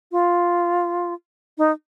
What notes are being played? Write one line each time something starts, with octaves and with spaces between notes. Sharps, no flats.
F4
D#4